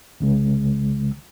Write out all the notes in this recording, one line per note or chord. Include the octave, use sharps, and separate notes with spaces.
C2 C#3 G#3